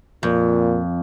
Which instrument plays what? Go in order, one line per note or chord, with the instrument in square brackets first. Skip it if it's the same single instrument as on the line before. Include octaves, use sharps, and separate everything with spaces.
[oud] F2 [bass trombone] A#2